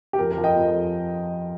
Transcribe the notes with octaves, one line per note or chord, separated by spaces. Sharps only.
G4
F2 A#4
A#4
F3
D#5 G5
F2